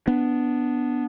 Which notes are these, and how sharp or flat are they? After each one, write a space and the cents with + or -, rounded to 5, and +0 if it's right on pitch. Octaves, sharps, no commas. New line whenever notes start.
B3 +0 D4 +0